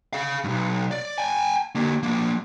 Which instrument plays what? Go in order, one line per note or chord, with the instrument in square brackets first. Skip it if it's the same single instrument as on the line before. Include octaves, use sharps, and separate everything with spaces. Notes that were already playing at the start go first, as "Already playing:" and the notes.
[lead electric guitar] G#4 F5
B1 G2
D5
G5 G#5
D3 A#3
F3 A#3